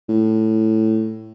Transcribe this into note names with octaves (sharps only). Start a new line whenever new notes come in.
A2